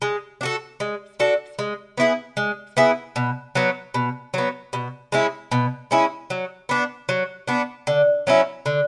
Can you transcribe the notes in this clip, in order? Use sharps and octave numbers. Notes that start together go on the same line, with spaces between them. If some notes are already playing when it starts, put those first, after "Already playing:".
G#3
D4 F#4 A4
G#3
D4 F#4 A4
G#3
B3 E4 G#4
G#3
B3 E4 G#4
B2
F#3 B3
B2
F#3 B3
B2
G#3 C#4 E4
B2
G#3 C#4 E4
F#3
B3 D4
F#3
B3 D4
D3
F#3 C#4 E4
D3